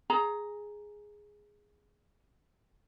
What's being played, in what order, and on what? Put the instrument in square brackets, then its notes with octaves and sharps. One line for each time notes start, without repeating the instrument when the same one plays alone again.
[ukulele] G#4 A#5